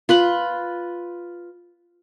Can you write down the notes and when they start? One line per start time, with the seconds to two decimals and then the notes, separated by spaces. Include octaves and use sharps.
0.09 F4 B4 B5